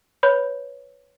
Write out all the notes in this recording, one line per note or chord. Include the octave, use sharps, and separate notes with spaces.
B4 C#5 B5 G6